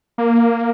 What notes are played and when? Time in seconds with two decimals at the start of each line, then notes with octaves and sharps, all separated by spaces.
0.18 A#3